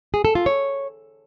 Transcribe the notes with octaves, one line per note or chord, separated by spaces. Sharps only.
G#4
A4
F4
C#5